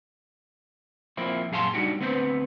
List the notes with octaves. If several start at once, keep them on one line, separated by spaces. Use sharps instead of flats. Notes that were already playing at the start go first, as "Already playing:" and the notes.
F3 A#3 C4 E4
F#2 A#2 G#4 F5 A5 C6
G3 D4 D#4 F#4 G4
D2 B3 C4 B4 C5